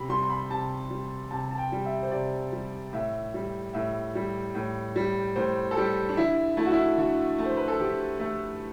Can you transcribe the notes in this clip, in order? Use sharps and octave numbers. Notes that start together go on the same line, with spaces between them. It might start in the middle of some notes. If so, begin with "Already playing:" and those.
Already playing: C3 B5
G3 C6
C6
B5
C3 A5
G3
C3 A5
A5
G5
G3
E5
C5
C3 D5
G3
A2 E5
G3
A2 E5
G3
A2
G3
A2 C5
A4
G3 G4
D4
D3 E4
A3 E4
F#4
E4
D3 F#4
A3
C5
B4
A4
D3 G4
A3